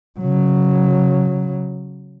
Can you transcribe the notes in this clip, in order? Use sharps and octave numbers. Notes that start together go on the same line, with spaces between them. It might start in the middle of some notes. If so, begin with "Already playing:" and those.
C#3 F#3